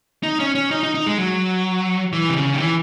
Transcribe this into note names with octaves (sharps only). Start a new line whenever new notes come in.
D#4
C#4
C#4
D#4
D#4
D#4
G#3
F#3
E3
C3
C#3
D#3
E3